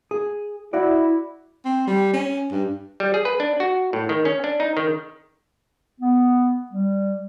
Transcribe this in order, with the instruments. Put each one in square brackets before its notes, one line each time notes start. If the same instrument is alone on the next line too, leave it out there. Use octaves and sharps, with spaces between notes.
[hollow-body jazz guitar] G#4
[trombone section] E4 [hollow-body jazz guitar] F#4 D5
[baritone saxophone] C4
G3
C#4
G2
[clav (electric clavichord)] G3
G#4
B4
D4
F#4
A2
D#3
C#4
D4
D#4
D#3
[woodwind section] B3
G3